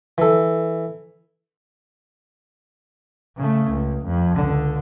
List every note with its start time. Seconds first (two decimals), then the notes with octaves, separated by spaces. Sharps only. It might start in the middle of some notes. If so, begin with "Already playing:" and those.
0.18 E3 A4
3.37 C#3 A3
3.70 C#2
4.05 F2
4.35 C#2 D3